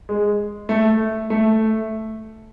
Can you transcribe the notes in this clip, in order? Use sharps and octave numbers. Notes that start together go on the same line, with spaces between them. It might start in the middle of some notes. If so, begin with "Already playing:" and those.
G#3
A3
A3